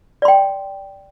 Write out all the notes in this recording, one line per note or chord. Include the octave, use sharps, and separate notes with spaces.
D5 G5 C6